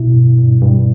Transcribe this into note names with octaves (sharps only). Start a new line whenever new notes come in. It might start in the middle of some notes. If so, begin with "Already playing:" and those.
Already playing: B2 E4
G2
G2
G2